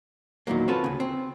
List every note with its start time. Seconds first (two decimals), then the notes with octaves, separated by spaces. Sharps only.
0.47 E2 A#2 D#3 E3 F#3 A#3
0.68 C4 C#4 F4 F#4 A4 B4
0.84 D2 C#3
1.00 C4